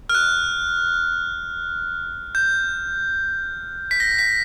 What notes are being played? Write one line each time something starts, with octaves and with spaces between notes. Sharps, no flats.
F6
F#6
G6
B6
A#6
B6